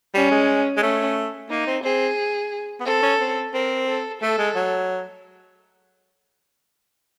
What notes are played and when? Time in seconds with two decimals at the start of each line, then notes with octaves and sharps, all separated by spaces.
0.14 G3 C#4
0.31 G#3
0.77 G#3
0.82 A3 C#4
1.50 A#3 D#4
1.67 C4
1.84 C4 G#4
2.80 B3
2.86 C4 A4
3.02 C#4
3.20 C4
3.53 C4 A#4
3.87 A4
4.22 A3 A4
4.38 G#3
4.55 F#3